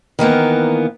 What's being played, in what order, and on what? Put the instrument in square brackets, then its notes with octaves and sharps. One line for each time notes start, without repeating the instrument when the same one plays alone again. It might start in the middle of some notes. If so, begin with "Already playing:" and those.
[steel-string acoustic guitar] D#3 E3 A#3 B3